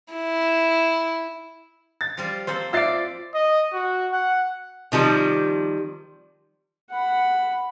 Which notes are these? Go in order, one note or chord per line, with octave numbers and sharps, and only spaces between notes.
E4
A6
F3 G3 F4
A#3 C4 A4 C5
F4 D5 E5 A6 C7
D#5
F#4
F#5
C3 D#3 F3 G3
F#5 B5